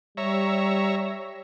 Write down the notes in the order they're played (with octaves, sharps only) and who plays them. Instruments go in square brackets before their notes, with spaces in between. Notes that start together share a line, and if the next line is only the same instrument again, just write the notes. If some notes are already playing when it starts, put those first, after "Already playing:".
[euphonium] G3 [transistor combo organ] C#5 E5 A#5